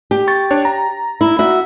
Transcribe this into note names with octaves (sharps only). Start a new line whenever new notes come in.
G4
C#6 A6
D4 C#5
A#5
E4
F#4 E5